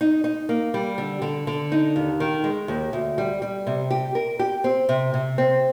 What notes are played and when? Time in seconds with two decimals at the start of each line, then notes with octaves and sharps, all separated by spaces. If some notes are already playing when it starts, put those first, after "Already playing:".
0.01 D#4
0.24 D#4
0.49 A#3
0.74 G3
0.98 D3
1.22 D3
1.47 D3
1.72 D#4
1.96 D#2
2.20 D#3
2.44 G#3
2.68 D#2
2.93 D2
3.18 G3
3.42 G3
3.67 C3
3.90 G4
4.15 A#4
4.39 G4
4.64 C4
4.89 C3
5.14 C3
5.38 C4